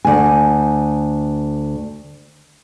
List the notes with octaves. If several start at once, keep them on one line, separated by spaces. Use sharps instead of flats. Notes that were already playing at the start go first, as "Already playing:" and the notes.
D2 G#5